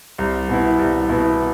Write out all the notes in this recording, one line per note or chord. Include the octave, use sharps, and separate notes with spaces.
C2
B2 B3 E4
C2
B2 B3 E4